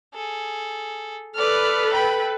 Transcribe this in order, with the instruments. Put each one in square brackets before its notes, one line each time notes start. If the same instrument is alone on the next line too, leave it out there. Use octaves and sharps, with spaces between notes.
[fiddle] G#4 A4
[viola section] A4 B4 [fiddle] D5 F6
[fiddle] G5 B5